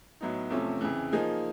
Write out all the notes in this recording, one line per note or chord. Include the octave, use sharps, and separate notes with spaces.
A2 F#3 B3 D#4
E2 C3 F3 A3 C#4
F2 C#3 E3
F3 A#3 D#4 G#4